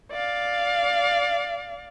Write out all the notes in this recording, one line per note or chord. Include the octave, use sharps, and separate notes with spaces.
D5 F5